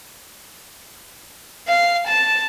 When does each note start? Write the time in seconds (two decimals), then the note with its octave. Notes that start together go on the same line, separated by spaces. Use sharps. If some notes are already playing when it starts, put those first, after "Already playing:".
1.68 F5
2.07 A5